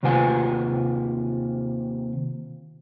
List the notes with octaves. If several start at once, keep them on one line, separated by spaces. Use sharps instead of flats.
D#2 C3 F4 B4 F#5 G#5